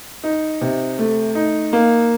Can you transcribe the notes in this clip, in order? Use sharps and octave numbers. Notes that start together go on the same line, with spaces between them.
D#4
C3
A3
D#4
A#3